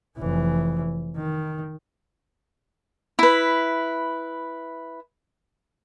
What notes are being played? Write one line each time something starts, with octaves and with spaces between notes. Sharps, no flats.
F1 E3
D#3
E4 B4